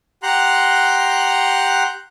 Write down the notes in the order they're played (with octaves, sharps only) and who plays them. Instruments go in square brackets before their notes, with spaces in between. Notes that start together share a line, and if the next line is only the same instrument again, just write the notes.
[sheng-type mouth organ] G4 F#5 A#5 C6 F#6